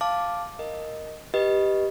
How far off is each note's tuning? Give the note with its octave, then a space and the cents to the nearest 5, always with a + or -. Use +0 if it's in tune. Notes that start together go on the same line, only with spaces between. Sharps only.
F5 +0 A5 +0 D6 +0
A#4 +0 D#5 +0
G4 +0 B4 -15 D#5 +0